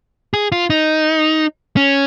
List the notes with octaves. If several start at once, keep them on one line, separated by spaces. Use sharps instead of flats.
G#4
F4
D#4
C#4